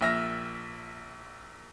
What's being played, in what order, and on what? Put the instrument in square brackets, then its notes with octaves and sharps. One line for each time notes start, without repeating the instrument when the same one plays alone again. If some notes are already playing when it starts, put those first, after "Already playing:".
[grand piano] A#1 A#2 E5 F6 A#6